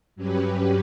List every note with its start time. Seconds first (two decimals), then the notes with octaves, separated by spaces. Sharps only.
0.16 G2 F#3 C#4 G4 B4